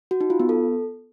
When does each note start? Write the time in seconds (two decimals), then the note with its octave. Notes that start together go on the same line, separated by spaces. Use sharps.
0.11 F#4
0.21 D#4
0.30 F4
0.40 B3
0.49 A4